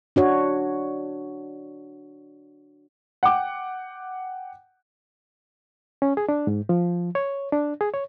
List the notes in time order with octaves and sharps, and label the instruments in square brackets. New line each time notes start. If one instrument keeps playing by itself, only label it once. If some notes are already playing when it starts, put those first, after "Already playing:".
[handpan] D4 F#4 C#5
[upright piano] F#5 G5 D6
[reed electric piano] C#4
G#4
D4
G#2
F3
C#5
D4
G#4
C#5